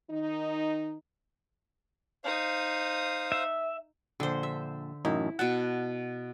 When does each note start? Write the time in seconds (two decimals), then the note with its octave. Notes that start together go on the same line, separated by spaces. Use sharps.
0.11 D#3 D#4
2.25 D#4 C5 F5 D#6
3.32 E5
4.20 A#1 D3 C5
4.43 E5
5.05 A1 F#2 D#4 E4
5.39 B2 E5 F#5 A5